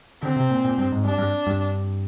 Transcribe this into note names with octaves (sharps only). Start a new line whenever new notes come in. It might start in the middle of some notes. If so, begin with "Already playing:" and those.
D3 C4
C3
A#2
A#2
G2
G#2
G2 D4
G2
G2